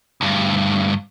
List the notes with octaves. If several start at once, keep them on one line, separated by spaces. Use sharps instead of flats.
D2 G2